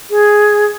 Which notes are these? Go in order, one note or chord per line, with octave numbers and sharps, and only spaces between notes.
G#4